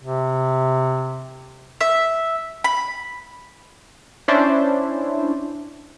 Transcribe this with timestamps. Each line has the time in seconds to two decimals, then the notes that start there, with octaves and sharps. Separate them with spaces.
0.01 C3
1.81 E5
2.64 B5
4.28 C#4 D4 E4 C5